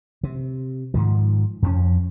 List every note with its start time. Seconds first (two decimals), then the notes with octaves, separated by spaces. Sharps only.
0.23 C3
0.94 G#2 D#3 F3
1.62 F2 F3 C#4